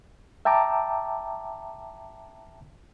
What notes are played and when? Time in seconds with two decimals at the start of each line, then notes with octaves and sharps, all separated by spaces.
0.45 E5 G5 A5 A#5 D6